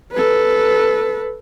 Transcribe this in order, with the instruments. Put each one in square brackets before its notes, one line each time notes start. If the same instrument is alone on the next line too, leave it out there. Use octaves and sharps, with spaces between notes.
[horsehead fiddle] A4 B4